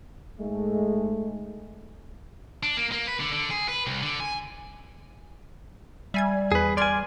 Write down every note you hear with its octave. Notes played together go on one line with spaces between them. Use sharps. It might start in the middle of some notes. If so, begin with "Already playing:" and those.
G#2 G#3 A3
D4
A#3
A#3
B4
D3
D3
G#4
B4
C2
D3
G#5
G3 E5 G#5 G#6
E2 G#4 B4
D5 G#5 C6 F6 G#6